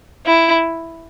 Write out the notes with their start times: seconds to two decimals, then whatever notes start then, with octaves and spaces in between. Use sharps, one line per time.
0.26 E4